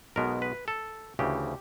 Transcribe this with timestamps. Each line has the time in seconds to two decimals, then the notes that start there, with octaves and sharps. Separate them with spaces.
0.16 B1 B2 G#3 B3 A#4
0.42 B4
0.68 A4
1.19 D2 C#3 E3 G4